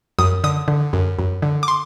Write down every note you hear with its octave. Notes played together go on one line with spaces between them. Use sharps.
F#2 D#6
D3 D#6
D3
F#2
F#2
D3
D6
C6